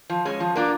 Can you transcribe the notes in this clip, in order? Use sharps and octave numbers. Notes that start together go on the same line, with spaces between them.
F3
G#3 C#4
F3
A#3 D4 F4